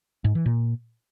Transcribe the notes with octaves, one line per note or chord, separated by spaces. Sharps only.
G#2
E3
A#2